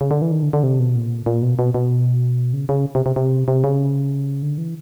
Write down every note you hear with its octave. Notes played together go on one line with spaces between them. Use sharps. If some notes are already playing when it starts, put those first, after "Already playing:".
C#3
D3
E3
D#3
D3
D3
C3
B2
A#2
A#2
B2
B2
B2
C#3
C#3
C3
C3
C3
C3
C#3
D3
E3